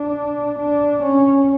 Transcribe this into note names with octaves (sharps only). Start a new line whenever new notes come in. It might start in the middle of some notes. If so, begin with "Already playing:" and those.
Already playing: D4
D4
C#4